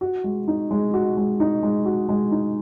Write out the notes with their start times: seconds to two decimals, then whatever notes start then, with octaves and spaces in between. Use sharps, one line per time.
0.01 F#4
0.24 G#3
0.48 D#4
0.71 G#3
0.94 F#4
1.17 G#3
1.40 D#4
1.63 G#3
1.85 F#4
2.09 G#3
2.31 D#4